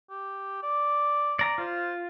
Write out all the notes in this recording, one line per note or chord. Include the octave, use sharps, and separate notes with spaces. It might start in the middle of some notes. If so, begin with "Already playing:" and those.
G4
D5
D5 A#5
F4 C5